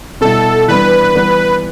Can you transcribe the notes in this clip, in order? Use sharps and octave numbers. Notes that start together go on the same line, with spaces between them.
B2 G3 E4 A4
E3 G3 B3 D4 B4
E3 G3 B3